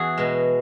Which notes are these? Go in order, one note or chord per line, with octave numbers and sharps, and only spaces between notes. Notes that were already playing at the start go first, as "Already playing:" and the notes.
Already playing: E2 F#4 G#4
B2 G#3